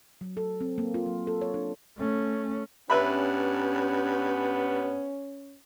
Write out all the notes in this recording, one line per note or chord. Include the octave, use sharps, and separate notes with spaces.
F#3
A4
C4
A#3
F4
F#3
A4
C#5
D4
A3 C#4
G2 B3 C#4 B4 E5 B5